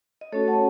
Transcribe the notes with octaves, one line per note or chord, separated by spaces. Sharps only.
D#5
A3 C#4 F#4 A4 C#5
F#5 A5